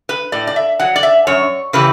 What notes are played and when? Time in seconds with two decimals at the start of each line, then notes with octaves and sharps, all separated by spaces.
0.09 B4
0.32 A2 D5
0.47 D5
0.56 E5
0.79 F#3 F#5
0.96 D5
1.03 E5
1.27 F#2 C#5
1.73 C#3 E3 G3 B4